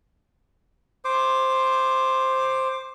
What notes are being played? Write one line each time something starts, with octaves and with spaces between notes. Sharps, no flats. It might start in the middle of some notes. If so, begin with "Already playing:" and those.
C5 D6